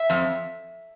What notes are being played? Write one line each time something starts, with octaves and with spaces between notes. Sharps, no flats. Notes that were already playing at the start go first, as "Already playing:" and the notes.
Already playing: E5
F2